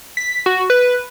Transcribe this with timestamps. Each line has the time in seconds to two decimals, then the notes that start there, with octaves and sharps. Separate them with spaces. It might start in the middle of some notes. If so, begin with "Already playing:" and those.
0.17 B6
0.46 F#4
0.70 B4